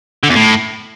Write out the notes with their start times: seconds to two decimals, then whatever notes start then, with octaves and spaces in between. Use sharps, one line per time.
0.23 D3
0.29 E2
0.35 A2